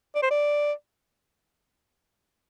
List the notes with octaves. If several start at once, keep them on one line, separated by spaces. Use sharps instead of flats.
D5
C5
D5